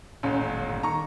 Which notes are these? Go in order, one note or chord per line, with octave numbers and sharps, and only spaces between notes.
D#1 A1 C#4
G1
D#3 A#5 C#6